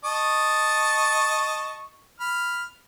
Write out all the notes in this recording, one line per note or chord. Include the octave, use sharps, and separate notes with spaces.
D#5 A5 C#6
B5 F6